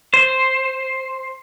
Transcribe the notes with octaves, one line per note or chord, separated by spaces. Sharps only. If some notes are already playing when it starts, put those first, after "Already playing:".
C5